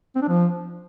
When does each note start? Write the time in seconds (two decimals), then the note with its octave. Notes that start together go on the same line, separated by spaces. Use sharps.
0.16 C4
0.22 D4
0.28 F3